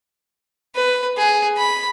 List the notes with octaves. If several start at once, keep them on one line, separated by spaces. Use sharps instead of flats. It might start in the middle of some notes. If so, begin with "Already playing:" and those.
B4
G#4
B5